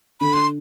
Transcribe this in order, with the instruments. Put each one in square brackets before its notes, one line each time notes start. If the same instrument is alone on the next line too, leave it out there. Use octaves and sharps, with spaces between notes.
[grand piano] D3 [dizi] B5
[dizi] C6